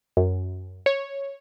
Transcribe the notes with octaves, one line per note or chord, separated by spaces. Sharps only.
F#2
C#5